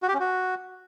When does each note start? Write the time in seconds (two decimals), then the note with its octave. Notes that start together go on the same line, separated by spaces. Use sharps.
0.03 F#4
0.08 G4
0.14 C#4
0.20 F#4